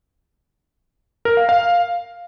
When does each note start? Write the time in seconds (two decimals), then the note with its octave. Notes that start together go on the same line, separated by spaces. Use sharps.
1.25 A#4
1.37 F5
1.49 F5